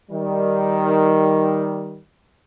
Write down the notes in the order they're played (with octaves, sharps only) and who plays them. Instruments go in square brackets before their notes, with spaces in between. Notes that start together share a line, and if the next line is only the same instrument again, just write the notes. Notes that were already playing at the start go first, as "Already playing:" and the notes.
[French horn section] D#3 G3